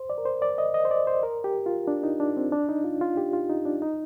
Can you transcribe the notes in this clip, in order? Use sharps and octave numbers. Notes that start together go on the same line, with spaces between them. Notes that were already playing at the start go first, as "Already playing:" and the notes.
Already playing: C5
D5
A#4
C5
D5
D#5
D#5
C5
D5
C5
A#4
G4
F4
D4
D#4
D4
C4
D4
D#4
F4
F4
G4
F4
D#4
D4
D#4